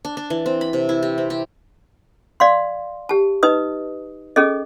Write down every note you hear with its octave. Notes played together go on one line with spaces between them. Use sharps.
D4
D4
E3
C4
B5
C3
E4
G4
C4
G4
D5 F5 C6
G4 A5
D#4 B4 D#5 D#6
C#4 G#4 A4 D#5